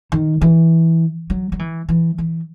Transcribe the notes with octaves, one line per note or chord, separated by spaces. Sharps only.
D#3
E3
F#3
F#3
E3
E3
E3